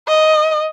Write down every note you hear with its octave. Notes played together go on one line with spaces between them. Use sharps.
D#5